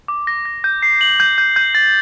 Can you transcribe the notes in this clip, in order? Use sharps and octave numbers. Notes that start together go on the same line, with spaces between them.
D6
A#6
A#6
G6
C7
F#7
G6
G6
G6
A6